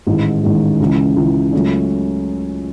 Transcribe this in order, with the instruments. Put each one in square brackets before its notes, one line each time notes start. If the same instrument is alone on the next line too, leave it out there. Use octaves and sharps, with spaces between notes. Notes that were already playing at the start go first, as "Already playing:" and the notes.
[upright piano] A1 G#2 D#3 G#3
A1 G#2 D#3 G#3
C#2 C#3 E3
C#2 C#3 E3
C#2 C#3 F#3 A3 C#4